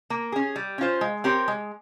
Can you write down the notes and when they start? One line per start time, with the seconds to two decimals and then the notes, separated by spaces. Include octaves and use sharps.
0.10 A#3
0.32 C#4 G#4
0.56 G3
0.78 C#4 F4 C5
1.01 G#3
1.24 C4 G4 A#4 C#5
1.48 G#3